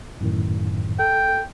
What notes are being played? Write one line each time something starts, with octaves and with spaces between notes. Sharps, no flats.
F#2 A2 D#3
A4 G5